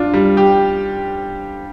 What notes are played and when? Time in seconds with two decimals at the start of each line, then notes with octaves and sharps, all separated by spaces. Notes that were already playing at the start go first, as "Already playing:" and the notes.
Already playing: D4 F4
0.14 G3
0.37 G4